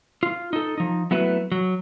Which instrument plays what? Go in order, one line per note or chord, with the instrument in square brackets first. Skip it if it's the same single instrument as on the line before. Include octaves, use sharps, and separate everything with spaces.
[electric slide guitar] F4
D#4 A4
F3 D#4
F#3 A3 B3 E4 F#4 B4
F#3